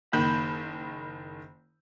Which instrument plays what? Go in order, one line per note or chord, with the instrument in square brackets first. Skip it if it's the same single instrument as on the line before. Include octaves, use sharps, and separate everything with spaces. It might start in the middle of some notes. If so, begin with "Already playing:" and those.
[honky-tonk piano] F#1 D#3 G6 [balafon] A#3 [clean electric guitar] B5